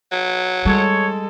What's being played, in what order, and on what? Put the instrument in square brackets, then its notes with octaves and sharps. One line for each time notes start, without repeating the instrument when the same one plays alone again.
[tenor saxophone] F#3
[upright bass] G3 [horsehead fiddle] G#3 A4 [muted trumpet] C#5